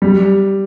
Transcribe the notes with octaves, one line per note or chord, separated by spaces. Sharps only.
G3